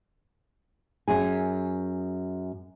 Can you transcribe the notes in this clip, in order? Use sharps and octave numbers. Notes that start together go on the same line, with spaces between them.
F#2 G#4 G#5